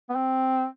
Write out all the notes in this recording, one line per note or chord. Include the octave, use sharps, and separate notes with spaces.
B3
C4